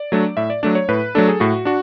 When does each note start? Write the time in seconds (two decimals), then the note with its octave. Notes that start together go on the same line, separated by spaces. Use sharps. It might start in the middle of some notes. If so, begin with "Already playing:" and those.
Already playing: D5
0.12 F#3 A3 D4
0.37 A2 E5
0.50 D5
0.63 F#3 A3 D4 D5
0.75 C#5
0.89 A2 B4
1.15 F#3 A3 D4 A4
1.28 G#4
1.40 A2 F#4
1.65 D4 F#4